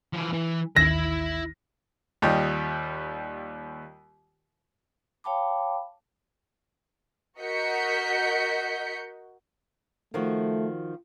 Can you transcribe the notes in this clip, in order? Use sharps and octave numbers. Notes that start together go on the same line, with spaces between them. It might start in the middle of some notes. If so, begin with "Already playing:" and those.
E3 F3
E3
A1 D#2 D#3 E4 E5 A#6
D#2 G3 F4 D#5 G5
C#5 F5 G5 A5 B5 D6
F#4 A#4 D#5 G6 B6 C#7
D#3 F3 A3 F#4